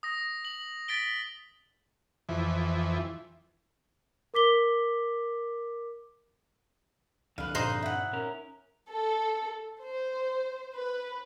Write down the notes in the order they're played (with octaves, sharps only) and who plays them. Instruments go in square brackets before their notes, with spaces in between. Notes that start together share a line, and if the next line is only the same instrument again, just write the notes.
[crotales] D#6 A#6
F#7
A6 B6 D7 G7
[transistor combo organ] F2 E3
[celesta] A#4 D6 B6 G7
[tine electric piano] C2 [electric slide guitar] F2 D3 [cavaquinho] B4 F5
[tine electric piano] G2 A#2 [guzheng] D#4 C5
[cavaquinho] E4 F#5
[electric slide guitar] C#4 A#4
[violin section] A4
C5
B4